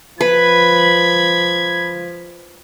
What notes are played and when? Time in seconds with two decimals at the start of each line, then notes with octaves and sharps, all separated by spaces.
0.21 F3 B4 B5 G#6